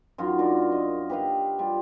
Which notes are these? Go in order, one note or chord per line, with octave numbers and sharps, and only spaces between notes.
F#2 D#3 F4 F#4
D4 A#4
D#5
G4 B4 D#5 F5
G3 F4